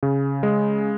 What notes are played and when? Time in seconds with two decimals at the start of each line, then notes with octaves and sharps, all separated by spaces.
0.03 C#3
0.43 G#3